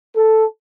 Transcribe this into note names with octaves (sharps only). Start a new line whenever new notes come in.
A4